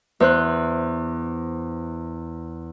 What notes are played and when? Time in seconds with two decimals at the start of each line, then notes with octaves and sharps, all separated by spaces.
0.20 E2 C5 F#6